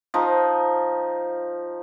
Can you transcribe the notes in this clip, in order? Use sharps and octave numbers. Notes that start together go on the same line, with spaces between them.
F3 D#4